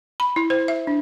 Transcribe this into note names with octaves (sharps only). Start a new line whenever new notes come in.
B5
E4
C5
E5
D4